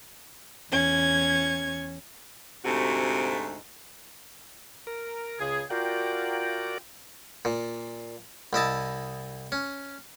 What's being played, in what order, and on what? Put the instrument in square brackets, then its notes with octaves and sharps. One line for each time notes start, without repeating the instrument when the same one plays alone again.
[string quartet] E2 C#4 G#6
[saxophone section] D2 G#2 C3 A3 F#4
[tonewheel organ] A#4
[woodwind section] C#2 C#3 G#4
[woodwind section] F4 G5 [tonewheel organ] F#4 A#4 D5
[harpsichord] A#2
C2 E4 D#5 A5
C#4